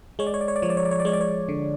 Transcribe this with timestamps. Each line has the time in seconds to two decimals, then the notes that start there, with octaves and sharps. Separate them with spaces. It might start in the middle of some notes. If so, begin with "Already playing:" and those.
0.19 G#3 C#5
0.27 D5
0.34 C#5
0.41 D5
0.48 C#5
0.56 D5
0.62 F3 C#5
0.70 D5
0.77 C#5
0.85 D5
0.91 C#5
1.00 D5
1.05 G#3 C#5
1.13 D5
1.21 C#5
1.49 D3